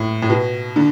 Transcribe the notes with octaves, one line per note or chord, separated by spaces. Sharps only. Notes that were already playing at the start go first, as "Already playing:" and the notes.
Already playing: A2
A2
B2
D3